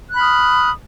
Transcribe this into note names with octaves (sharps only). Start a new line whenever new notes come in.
B5 D#6 F6 F#6